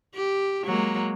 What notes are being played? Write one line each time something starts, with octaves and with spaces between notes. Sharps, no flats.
G4
F#3 G#3 A#3